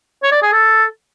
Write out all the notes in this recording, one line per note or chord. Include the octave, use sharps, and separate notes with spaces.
C#5
D5
G#4
A4